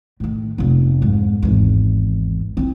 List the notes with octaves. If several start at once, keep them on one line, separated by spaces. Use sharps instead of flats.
A2 D#3
F1 B3
F2 G#2
G#1 E2
C4 E4